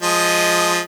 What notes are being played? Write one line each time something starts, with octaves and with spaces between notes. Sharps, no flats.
F3 G#3 D#5